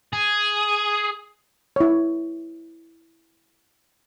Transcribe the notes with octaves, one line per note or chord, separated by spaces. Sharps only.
G#4
E4 C#5